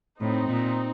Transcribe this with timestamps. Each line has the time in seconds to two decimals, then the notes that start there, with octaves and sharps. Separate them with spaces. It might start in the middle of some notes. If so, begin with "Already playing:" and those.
0.20 A2 C4 D#4
0.49 A#2